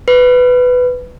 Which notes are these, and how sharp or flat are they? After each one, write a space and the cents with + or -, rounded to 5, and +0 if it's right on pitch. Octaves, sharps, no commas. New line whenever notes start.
B4 +10